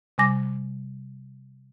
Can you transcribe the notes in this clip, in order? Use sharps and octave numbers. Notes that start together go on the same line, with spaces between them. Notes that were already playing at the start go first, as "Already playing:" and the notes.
C3 G3 G#5 D6 A#6